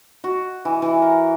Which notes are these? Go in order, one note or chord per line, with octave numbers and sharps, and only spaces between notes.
F#4
E3
E3
A#4